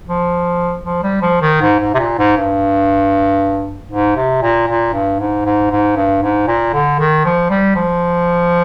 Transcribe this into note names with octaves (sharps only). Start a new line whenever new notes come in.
F3
F3
G3
F3
D#3
G#2
G#2
C3
A#2
G#2
G2
G#2
C3
A#2
A#2
G2
G#2
G#2
G#2
G2
G#2
A#2
D3
D#3
F3
G3
F3